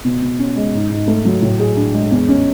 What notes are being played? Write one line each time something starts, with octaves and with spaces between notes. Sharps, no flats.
B2
B2
C#4
G#3
G#2
G#2
A3
F#3
A2
G#4
D4
G#3
E2
C#4